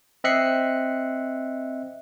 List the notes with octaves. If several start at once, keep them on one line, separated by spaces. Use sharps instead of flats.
C4 D#5 E5 F#6 C7 C#7